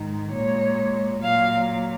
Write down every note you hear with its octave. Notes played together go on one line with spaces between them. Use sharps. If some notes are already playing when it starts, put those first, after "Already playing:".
Already playing: G#2 D#3 G#3
A#2 G#3 C#5
A#2 F#3 F5